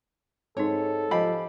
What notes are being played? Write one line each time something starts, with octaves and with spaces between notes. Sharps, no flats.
G#2 C4 D#4 A4 C#5
F3 G4 D#5 F5 G#5 B5